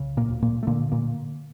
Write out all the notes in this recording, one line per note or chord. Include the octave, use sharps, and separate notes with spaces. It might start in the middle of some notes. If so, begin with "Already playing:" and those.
Already playing: C2 C#3
A#2 A#3
D2
A#2 A#3
A3
A#2 D3 A#3
A#2 A#3